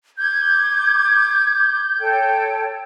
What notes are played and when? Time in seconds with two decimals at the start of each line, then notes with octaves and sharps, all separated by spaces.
0.18 D6 G6 G#6
1.99 A4 C#5 G5